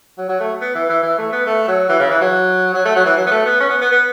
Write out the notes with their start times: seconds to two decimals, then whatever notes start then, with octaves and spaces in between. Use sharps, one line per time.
0.18 F#3
0.29 F#3
0.40 A3
0.61 B3
0.75 E3
0.89 E3
1.03 E3
1.18 A3
1.32 B3
1.46 A3
1.68 F#3
1.89 E3
1.99 C#3
2.11 E3
2.21 F#3
2.74 F#3
2.85 A3
2.95 F#3
3.06 E3
3.17 F#3
3.27 B3
3.31 A3
3.46 B3
3.60 C#4
3.70 B3
3.81 B3
3.92 B3